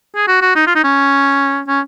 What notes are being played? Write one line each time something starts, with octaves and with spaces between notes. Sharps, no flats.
G#4
F#4
F#4
D#4
F4
D#4
C#4
C#4